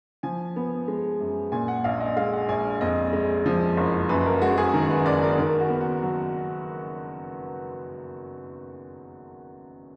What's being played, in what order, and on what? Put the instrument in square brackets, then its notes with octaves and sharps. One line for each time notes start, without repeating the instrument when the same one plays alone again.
[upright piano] F3 G#5
B3
G#3
F#2
A#2 G#5
F#5
A#1 F5
D#5
G#3 F5
F#5
A#1 G#5
F2 D#5
G#3
F3
F#1
F#2 B4
A#4
G#3 F#4
G#4
D#3 A#4
B4
F#1 D5
A#4
D#3 A#4
F#4
B3
F#4
F#3